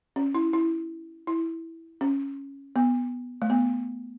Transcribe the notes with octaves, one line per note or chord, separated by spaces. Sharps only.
C#4
E4
E4
E4
C#4
B3
A3
B3